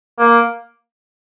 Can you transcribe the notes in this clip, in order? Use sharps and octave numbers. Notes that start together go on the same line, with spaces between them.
A#3